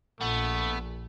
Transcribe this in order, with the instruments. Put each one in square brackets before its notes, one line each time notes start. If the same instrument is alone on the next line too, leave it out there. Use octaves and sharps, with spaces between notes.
[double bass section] A#1 [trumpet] A3 [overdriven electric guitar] B3